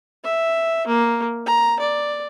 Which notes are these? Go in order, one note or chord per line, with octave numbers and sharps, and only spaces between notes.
E5
A#3
A#5
D5